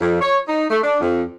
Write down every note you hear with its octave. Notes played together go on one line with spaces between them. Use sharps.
F2
C#5
D#4
A3
D4
F2